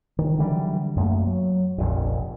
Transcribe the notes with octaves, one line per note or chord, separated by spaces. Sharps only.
D#3
D3 E3 F#3 G3
F#2 A3 A#3
F#3
F1 A#1 F2